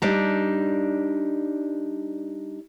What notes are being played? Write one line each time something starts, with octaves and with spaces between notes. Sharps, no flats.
G3 D4 D#4